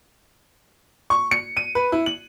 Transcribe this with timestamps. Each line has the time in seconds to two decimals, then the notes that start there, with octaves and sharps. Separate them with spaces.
1.10 C#6
1.31 C#7
1.57 D#7
1.75 B4
1.92 E4
2.06 F#7